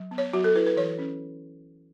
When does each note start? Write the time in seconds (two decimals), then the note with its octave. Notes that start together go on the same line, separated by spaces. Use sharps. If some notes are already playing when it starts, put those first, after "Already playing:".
Already playing: F#3
0.11 B3
0.18 C#5
0.33 F#3 F#4
0.44 A4
0.55 E4 B4
0.67 B4
0.77 E3 C#5
0.99 C#4